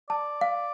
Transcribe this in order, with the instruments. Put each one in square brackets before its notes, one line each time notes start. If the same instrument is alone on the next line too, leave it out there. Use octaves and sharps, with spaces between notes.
[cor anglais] D5 [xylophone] A5
[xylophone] F5